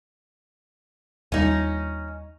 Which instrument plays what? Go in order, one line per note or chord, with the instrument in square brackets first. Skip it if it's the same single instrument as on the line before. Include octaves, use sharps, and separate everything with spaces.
[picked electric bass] D#2 G3 [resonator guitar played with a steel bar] C#4 D#4